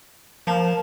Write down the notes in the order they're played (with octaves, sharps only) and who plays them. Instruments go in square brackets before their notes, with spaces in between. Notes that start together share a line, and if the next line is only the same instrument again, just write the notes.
[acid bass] F3 [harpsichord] A#3 [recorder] A5